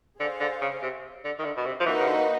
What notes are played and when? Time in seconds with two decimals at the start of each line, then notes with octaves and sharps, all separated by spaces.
0.20 D3 G#4 C5 F5
0.40 D3
0.61 C#3
0.82 C3
1.25 D3
1.39 D#3
1.44 D3
1.57 B2
1.66 C3
1.80 F3
1.86 E3 A#3 D#4 F#4 B4 D#5
1.99 C#3
2.07 D3